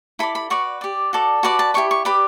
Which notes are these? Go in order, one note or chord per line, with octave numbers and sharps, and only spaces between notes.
E4 A4 D5 B5
B5
F#4 B4 D5 C#6
G4 D5
F#4 A4 D5
F#4 B4 D5 A5
A5
E4 G4 D5 C#6
C#6
G4 B4 D5 B5